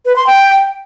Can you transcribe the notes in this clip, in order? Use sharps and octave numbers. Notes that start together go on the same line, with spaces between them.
B4
C6
G5